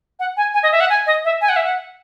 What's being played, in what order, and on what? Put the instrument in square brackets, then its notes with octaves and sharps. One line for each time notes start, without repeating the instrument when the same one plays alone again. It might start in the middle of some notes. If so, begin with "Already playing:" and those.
[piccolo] F#5
G#5
G#5
D#5
E5
F#5
G#5
D#5
E5
G#5
F#5
E5
F#5